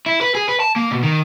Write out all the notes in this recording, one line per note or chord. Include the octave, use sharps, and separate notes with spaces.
E4
B4
G#4
B4
A5
A#3
B2
D#3